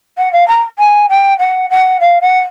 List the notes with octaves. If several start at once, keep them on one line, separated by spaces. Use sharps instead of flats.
F#5
F5
A#5
G#5
G5
F#5
F#5
F5
F#5